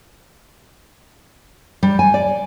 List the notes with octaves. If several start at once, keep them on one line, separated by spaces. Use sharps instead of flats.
G3
G#5
D5